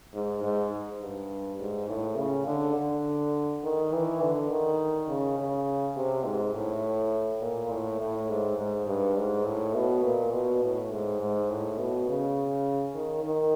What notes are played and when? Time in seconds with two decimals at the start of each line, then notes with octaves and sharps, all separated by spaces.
0.14 G#2
0.43 G#2
1.02 G2
1.60 G#2
1.89 A2
2.17 C#3
2.47 D3
2.76 D3
3.64 D#3
3.92 E3
4.22 D3
4.50 D#3
5.08 C#3
5.38 C#3
5.96 C3
6.25 G#2
6.54 A2
7.42 A#2
7.71 A2
8.00 A2
8.29 G#2
8.58 G#2
8.87 G2
9.17 G#2
9.46 A2
9.75 B2
10.04 A#2
10.33 B2
10.63 A2
10.91 G#2
11.21 G#2
11.50 A2
11.78 B2
12.08 C#3
12.95 D#3
13.24 D#3